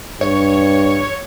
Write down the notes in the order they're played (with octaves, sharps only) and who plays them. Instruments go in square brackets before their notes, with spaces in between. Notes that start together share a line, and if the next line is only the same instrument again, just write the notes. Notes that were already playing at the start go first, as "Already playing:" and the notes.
[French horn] G2 [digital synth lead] C#5